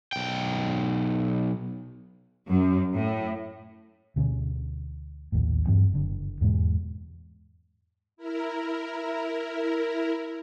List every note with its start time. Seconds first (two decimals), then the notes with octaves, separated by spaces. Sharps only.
0.13 B1 G5
2.48 F#2
2.94 A2
4.16 D2 B2 D3 C#4
5.32 A#1 D#2 A2
5.67 G2 E3 F#3 C4
5.92 F#1 D3
6.41 E2 G#2 B2 G#3
8.17 E4 A#4